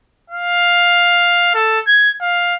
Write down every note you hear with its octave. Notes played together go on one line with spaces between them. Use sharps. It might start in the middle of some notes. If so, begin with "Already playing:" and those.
F5
A4
G#6
F5